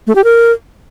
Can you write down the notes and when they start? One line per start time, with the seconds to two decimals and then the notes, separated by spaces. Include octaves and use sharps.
0.07 A3
0.15 G4
0.24 A#4